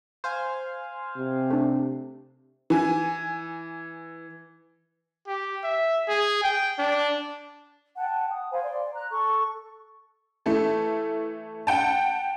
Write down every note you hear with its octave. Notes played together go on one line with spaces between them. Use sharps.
C5 F5 G#5
C3
A3 D4
E3 G#5
G4
E5
G#4
G5
D4
F#5 G5 A5
D#6
C5 F5 G#5 B5
D5 C6
A#5 F#6
A4 C#6
E3 A3 A4
F#5 G5 A5